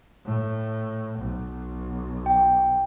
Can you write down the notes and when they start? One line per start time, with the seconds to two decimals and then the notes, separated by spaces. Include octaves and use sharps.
0.25 A2
1.19 B1
2.26 G5